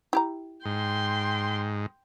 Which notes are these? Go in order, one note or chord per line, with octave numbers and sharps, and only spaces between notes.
E4 G4 A#5
G#2 G5 C6